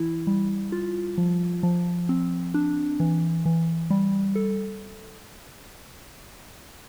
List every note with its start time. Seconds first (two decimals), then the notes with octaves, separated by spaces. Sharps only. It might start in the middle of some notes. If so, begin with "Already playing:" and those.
Already playing: E3 E4
0.27 G3
0.72 F4
1.18 F3
1.63 F3
2.09 C4
2.54 D4
3.00 E3
3.45 E3
3.90 G3
4.35 A4